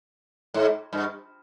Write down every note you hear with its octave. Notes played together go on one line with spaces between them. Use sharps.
G#2
G2